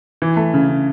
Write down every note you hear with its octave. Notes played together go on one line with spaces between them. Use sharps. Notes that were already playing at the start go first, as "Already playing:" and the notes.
E3
A3
C#3
C#3